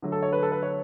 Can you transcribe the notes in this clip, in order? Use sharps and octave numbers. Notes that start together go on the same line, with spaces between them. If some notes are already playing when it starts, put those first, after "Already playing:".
D3 F#3 A3
A4
C#5
B4
A4
B4
C#5